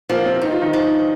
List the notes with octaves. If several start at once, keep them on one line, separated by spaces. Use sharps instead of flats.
A#2 F3 A#3
C3 C4
G2 D#4
F4
D#3 D#4
F3